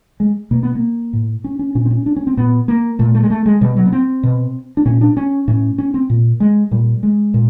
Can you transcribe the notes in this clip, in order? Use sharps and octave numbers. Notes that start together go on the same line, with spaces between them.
G#3
B2 A#3
B3
A#3
A2
C#4
C#4
A#2 C#4
C4
C#4
D4
C#4
C4
A#2 B3
A#3
A#2 A3
A3
G#3
A3
G#3
B2 G3
F#3
B3
C4
B2
D4
A#2 C#4
D4
C#4
A2 C#4
C#4
C4
A#2
G#3
A#2 G3
G#3
A#2